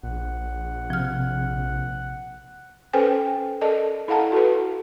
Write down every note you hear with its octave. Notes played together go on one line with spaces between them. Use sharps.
A#1 F#5
C3 F3 F6
C#4 A4 B4 C5 G5 G#5
A4 A#4 D5 D#5 A5
E4 A4 F5 F#5 A5 A#5
F#4 A4 B4